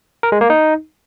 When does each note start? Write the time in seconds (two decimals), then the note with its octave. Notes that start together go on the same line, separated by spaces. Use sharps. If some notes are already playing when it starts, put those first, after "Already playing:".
0.23 A#4
0.32 G#3
0.41 A#3
0.50 D#4